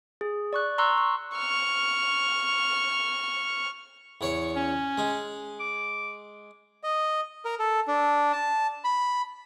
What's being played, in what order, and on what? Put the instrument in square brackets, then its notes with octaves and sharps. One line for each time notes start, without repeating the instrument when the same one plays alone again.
[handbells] G#4
D5 C#6 F#6
A#5 C6 C#6 E6 F#6
C#6
[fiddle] C#6 F6
[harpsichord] E2 C#5 C#6
[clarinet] C#4
[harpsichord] G#3
[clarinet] D6
[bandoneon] D#5
A#4
A4
D4
A5
B5